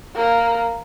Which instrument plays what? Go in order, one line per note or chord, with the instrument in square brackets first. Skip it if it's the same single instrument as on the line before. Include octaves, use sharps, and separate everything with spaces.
[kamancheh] A#3